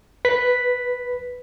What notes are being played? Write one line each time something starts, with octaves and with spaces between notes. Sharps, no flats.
B4 B6